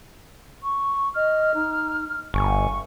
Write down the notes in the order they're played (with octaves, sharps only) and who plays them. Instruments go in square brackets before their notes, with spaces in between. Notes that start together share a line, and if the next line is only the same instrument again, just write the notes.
[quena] C#6
[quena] D#5 [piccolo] F6
[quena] D#4
[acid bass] G1 [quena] G#5 [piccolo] C#6